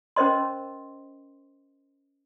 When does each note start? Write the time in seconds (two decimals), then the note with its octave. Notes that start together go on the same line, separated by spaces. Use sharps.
0.16 C#4 A#4 C5 D#5 C6